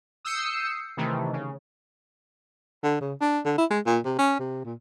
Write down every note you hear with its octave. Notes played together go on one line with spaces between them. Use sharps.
D#6 E6 G6 C7 C#7
C3 D#3 E3 A3
C#3
D3
C#3
D4
D3
E4
G#3
A#2
C3
C#4
C3
A#2